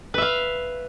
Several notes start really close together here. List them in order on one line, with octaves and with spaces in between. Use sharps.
B4 E5 F5